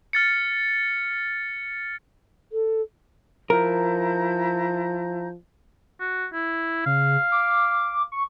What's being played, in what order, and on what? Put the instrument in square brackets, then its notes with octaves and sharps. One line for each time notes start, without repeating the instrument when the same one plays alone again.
[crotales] F6 A6 C#7
[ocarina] A4
[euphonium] F3 [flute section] E4 A#5 G6 [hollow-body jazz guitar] A#4
[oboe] F#4
E4
[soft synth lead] C#3 [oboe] F5
[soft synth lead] D6
C#6